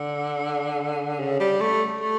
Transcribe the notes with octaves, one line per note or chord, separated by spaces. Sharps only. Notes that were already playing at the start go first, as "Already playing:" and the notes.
Already playing: D3
C#3
G3
A3
A3